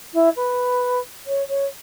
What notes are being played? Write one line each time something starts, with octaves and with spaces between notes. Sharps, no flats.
E4
B4
C#5
C#5